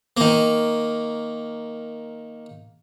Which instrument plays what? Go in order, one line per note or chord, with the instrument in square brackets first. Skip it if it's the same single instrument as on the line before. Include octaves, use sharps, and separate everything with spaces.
[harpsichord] D#3 A#3